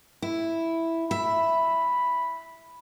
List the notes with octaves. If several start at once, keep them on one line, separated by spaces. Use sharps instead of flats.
E4
E5 B5